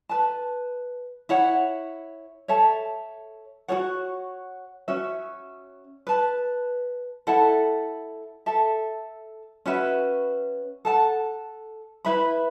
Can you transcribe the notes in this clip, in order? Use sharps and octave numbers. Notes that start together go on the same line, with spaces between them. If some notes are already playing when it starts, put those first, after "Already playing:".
B4 A5
E4 C#5 F#5
A4 C#5 E5 A5
F#4 A4 C#5 F#5
C#4 F#4 C#5 E5
B4 A5
E4 A4 F#5 A5
A4 E5 A5
C#4 F#4 B4 E5
A4 F#5 A5
E4 B4 E5 B5